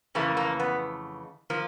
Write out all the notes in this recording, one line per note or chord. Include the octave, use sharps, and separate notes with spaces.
F2 C#3 E3 A3 A#3
A#3
B3
F3 A#3